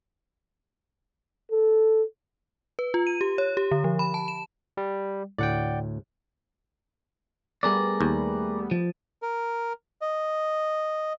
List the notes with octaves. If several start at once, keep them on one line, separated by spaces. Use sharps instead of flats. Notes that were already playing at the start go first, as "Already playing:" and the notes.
A4
B4
F4
D#7
G4
C#5
G4
D3
F3
B5
A5
E7
G3
D2 A2 D5 F#5 G5
G3 A3 B3 G#4 A#4 D5
D#2
F3
A#4
D#5